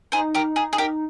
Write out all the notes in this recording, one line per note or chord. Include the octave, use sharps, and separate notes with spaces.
D#4 G#4 C5
G4 A#4
G#4
G#4
G4 A#4